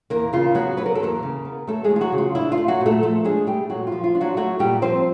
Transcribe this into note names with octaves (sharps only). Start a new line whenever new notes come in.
E2 A#3 A#4
C#3 F4
F#3 B3 F#4
F#3 B4
A#4
A4
E2 A#3 A#4
C#3
B3
F#3 A3 A4
G#3 G#4
E2
F4
F#3 F#4
C#3
F4
D4 E4
F4
A3
F#3 F#4
A#2
A3 A4
F3 A3 A4
G#3 D4 G#4
G3 A3 G4
A#2 F#3 F#4
F4
F3
F4
D4
F#3 F#4
F#3 A3 F#4
A#2 G3 G4
F3 C4 C5